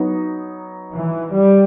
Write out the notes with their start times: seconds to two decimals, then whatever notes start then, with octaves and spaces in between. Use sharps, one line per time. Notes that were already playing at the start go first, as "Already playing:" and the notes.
Already playing: F#3 B3 D#4
0.94 E3
1.35 G3